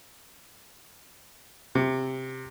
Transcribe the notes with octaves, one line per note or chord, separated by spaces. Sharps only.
C3